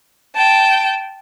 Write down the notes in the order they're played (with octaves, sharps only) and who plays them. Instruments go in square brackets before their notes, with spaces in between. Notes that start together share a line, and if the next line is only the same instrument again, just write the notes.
[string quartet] G5 A5